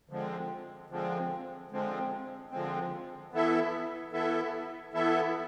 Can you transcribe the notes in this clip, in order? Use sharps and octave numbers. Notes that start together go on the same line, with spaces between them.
D3 F3 G#3 C4
D3 F3 G#3 C4
D3 F3 G#3 C4
D3 F3 G#3 C4
E3 B3 E4 A4 E5
E3 B3 E4 A4 E5
E3 B3 E4 A4 E5